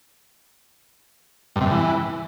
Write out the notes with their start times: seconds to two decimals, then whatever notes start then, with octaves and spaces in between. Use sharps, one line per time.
1.56 G2
1.61 C3
1.66 G2
1.71 E3